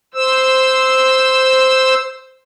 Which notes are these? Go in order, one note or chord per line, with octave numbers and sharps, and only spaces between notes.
C5 E6